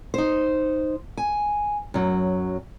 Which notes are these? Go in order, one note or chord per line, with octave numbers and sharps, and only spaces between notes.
D#4 C5
G#5
F#2 F#3